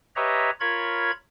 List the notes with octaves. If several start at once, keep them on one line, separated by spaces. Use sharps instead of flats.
G4 B4 C#5 D#5 E5 A#5
F4 A#4 C#5 B5 G#6